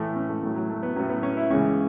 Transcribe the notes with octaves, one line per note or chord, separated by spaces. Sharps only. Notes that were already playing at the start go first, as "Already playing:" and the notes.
Already playing: A2 E3 A3
C#4
A3
A2 F#3 A3
F#3
A3
B3
A2 F#3 C#4
B3
C#4
E4
C#2 C#3 E3 C#4